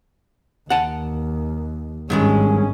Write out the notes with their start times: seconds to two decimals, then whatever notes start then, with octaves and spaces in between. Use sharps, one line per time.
0.70 D#2 F#5 A5
2.10 G#1 G2 D#3 G#3 C#4